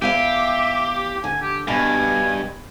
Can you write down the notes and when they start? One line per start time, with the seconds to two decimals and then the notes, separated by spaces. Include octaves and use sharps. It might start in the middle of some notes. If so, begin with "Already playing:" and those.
0.02 E2 G4 E5 F5 G#5
1.24 D3 G#5
1.41 G4
1.68 G2 B2 G#5